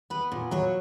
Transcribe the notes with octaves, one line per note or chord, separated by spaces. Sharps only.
B3 B4
A#2
F#3 C#5